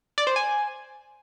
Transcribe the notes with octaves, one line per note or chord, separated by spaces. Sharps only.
D5
C5
G#5